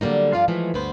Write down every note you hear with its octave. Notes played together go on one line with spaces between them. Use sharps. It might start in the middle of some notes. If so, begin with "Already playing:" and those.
D3 F#3 G3 A#3 D#4
G2 F3 F4 D5 F5
E3 F3 G#3 A3
D2 G2 B3 B4 C5